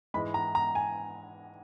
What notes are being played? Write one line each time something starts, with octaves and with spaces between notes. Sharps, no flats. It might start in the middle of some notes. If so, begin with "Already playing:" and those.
G#2 E3 G#3 B5
A#5
A#5
G#5